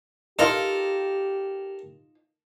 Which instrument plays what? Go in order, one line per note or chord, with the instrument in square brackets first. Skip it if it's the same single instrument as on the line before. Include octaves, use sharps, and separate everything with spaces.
[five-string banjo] D#4 F4 F5 [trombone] G4 [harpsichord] A4 A#4